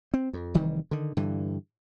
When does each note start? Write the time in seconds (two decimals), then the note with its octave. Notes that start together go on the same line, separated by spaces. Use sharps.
0.14 C4
0.33 F2
0.54 F1 D#3 E3 G3
0.91 D3 D#3
1.17 G2 D3 E3